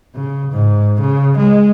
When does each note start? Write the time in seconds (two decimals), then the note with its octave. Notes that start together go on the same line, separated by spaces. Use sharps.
0.15 C#3
0.52 G#2
1.00 C#3
1.37 G#3